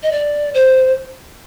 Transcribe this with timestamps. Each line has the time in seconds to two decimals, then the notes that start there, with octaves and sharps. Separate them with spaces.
0.03 D#5
0.12 D5
0.54 C5